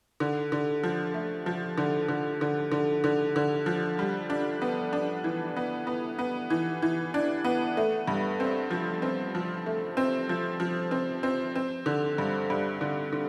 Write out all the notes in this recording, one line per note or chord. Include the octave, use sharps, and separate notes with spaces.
D3
D3
F3
A3
F3
D3
D3
D3
D3
D3
D3
F3
G3
D4
B3
D4
E3
B3
B3
B3
E3
E3
D4
B3
A3
G2
C4
F3
C4
F3
A3
C4
F3
F3
C4
C4
C4
D3
G2
G2
D3
D3